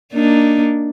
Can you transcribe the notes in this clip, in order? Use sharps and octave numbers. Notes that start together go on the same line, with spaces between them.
A#3 D4 D#4